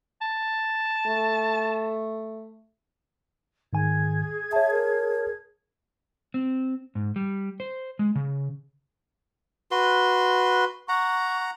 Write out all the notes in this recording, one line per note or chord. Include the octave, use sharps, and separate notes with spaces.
A5
A3
G#2 D#3 G#4 G#5 G#6
C#5 E5 A5
A#4
C4
G#2
G3
C5
G#3
C#3
F#4 B4 C6
F#5 A#5 C#6